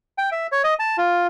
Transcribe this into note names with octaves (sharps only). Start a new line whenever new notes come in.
G5
E5
C#5
D#5
A5
F4